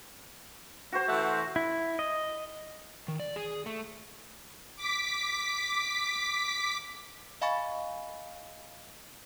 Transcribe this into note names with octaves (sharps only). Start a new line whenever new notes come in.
F#4 C5
E3 A3 F#5
E4
D#5
D#3
D5
G#4
A3
D6 B6
D#5 F5 G#5 B5 C#6 A6